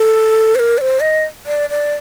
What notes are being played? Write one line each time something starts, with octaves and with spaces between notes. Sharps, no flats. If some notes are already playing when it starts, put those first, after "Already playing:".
Already playing: A4
C5
A#4
D5
C5
D#5
D5
D5